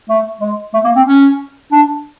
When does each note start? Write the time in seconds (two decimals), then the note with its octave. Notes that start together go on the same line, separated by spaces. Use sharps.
0.09 A3
0.41 G#3
0.74 A3
0.85 A#3
0.96 C4
1.06 C#4
1.72 D4